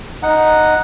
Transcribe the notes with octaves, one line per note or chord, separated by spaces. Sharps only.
D#4 F#5